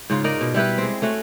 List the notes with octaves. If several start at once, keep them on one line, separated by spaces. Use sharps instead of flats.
G#2 C#3 F4
D#4 A#4 D5
B2
G3 E4 G4 B4
G#3 C4
A3 C#4 F#4